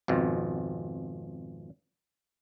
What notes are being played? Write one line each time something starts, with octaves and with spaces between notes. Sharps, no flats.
G#1 F2 B2